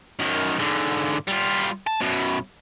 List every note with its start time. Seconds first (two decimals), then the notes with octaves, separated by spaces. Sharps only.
0.19 F#2 D#3
0.59 G#2 D3
1.27 G3 F4
1.87 A5
2.00 F#2 B2